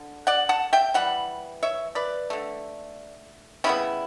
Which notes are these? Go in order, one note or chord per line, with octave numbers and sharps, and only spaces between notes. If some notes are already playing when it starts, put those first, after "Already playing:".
Already playing: D3
D5 F#5
F#5 A5
E5 G5
E3 G3 F#5
C#5 E5
B4 D5
D3 A3
C#3 G3 B3 C#4 E4